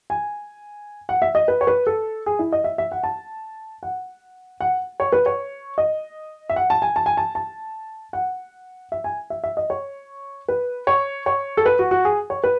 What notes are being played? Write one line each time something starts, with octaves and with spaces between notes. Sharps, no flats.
G#5
F#5
E5
D#5
B4
C#5
B4
A4
G#4
E4
D#5
E5
E5
F#5
A5
F#5
F#5
C#5
B4
C#5
D#5
E5
F#5
A5
G#5
A5
G#5
A5
A5
F#5
E5
G#5
E5
E5
D#5
C#5
B4
C#5
C#5
A4
B4
F#4
F#4
G#4
C#5
B4